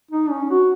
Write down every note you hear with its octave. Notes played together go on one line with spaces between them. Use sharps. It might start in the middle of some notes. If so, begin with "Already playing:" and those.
D#4
C#4
F#4